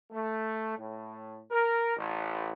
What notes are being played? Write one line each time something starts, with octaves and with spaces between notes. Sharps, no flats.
A3
A2
A#4
A1